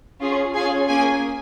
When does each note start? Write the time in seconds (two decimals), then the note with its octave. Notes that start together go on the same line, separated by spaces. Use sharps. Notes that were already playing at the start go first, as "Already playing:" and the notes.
0.21 C#4 F4 G#4
0.55 C#4 F4 G#4 G#5
0.89 A#3 C#4 G#4 G#5